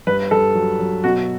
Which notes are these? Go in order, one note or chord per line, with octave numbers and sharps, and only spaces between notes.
G2 B4
G2 A4
F#3
F#3
B2 F#4